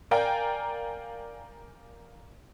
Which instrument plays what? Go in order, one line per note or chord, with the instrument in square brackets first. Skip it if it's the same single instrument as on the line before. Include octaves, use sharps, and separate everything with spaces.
[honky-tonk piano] A#4 D5 F5 G5 G#5 A#5